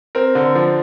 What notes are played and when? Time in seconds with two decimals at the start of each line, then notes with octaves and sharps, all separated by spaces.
0.15 C4 A#4
0.35 D3
0.55 F3